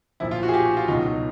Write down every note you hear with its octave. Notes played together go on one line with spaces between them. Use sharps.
B1 A#2 F3 E4
F4
F#4
G#4
G4
F#4
F4
C#2 B2 F#3 D#4